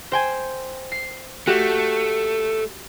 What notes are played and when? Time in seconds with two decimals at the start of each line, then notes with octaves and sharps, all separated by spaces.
0.12 C5 G5 G#5
0.92 C7
1.47 A3 F#4 G4 F#5